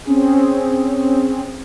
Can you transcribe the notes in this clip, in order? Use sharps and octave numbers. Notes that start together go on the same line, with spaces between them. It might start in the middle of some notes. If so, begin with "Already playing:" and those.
C4 C#4 G#4